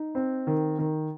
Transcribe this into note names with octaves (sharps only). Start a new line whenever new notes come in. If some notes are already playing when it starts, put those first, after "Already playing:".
Already playing: D#4
C4
D#3
D#3